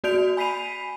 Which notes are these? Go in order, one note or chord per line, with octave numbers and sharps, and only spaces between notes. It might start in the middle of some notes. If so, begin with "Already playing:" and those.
A#3 F#4 D5 G6 D7 F7
G#5 B5 B6 C7 D#7 F7